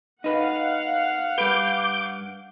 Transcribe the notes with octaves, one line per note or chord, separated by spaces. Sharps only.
D#4 B4 F5 F#5
G2 B4 D6 G6